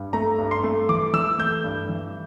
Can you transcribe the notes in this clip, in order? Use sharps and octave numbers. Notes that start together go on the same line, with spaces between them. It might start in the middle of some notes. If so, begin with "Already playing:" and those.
Already playing: G2
A3 A#5
G2
C6
A3
E3 D6
E3 E6
A3 G6
G2
E3